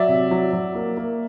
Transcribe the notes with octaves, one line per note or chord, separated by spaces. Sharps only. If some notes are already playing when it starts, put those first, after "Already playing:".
Already playing: F#3 D5 E5
C3
F#3
F#3
A#3
A#3